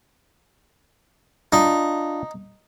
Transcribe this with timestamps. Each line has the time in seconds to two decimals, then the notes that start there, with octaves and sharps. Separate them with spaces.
1.52 D4 D#4 F4